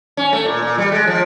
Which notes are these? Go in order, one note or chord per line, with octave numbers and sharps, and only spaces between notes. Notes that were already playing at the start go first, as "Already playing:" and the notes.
C#4
A3
A#2
A#2
G3
G#3
F3